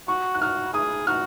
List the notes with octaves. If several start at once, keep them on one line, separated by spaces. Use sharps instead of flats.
F#4 C#6
F#6
F#4 F6
G#4 D#6
F#4 F6